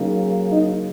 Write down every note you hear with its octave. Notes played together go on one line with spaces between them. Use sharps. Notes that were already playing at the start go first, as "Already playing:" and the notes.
Already playing: C#3 F#3 A#3 D#4
D#4